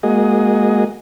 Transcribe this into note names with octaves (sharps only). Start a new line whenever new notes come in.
G#3 A#3 F#4 G#4 D#5